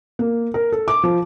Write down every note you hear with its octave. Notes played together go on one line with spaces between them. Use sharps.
A#3
A#4
A4
D6
F3